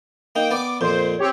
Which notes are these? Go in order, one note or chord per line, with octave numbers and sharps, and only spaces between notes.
A#3 D#4 G5
B3 D5 D6
F2 A#2 C5
C4 G4 C#5